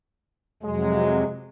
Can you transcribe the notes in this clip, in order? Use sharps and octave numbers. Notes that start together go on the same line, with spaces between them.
F2 C3 F#3 G#3